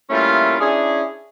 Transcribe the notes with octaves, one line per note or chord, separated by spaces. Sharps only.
G3 A3 A#3 C#4 E4 F4
C#4 D4 E4 G#4